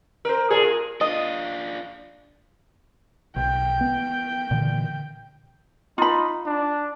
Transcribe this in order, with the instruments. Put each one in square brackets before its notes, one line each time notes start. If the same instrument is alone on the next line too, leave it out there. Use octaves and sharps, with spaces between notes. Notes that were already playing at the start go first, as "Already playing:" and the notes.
[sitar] A#4 C5
A#2 G#4 A4
F4
[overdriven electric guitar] D4 F4 [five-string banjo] D#5
[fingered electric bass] B1 [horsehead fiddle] G5
[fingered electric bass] B3
A#2 D3 E3
[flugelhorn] D#4 [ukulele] F4 B5
[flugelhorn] D4